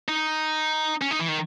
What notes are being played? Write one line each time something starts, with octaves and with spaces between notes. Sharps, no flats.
D#4
C#4
D#4
E3
D#3